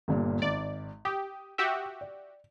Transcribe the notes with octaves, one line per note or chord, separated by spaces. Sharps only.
G1 G2 A#2
G#1 D5
G4 D#6
F#4 G4 E5
D5